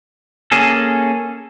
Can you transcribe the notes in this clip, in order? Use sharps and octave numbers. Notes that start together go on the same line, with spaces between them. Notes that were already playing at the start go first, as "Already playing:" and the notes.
A#3 C#4 G#4 A4